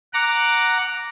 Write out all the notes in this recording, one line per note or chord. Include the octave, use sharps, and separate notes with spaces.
F#5 A#5 D6